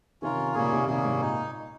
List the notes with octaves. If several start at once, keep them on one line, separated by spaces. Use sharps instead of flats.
C3 D#3 C#4 F4 A#4
A#2 C#3 G3 A#3 C#4 G#4
C3 D#3
C3 D#3 G3 A#3 C#4 G#4
G#2 C3
A#2 D#4